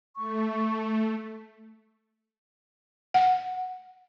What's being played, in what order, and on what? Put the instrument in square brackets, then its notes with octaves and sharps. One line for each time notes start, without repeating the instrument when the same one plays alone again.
[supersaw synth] A3 [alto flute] C#6
[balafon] F#5